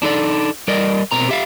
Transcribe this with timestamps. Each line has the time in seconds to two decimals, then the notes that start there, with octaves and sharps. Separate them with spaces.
0.02 D4 D#4 A4 D5
0.68 G3 A#4 D5 D#5
1.12 B2 C4 A#4 A#5
1.29 G4 E5 F5